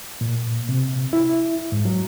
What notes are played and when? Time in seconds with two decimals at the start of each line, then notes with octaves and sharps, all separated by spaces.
0.21 A#2
0.69 C3
1.13 E4
1.72 G#2
1.85 F#3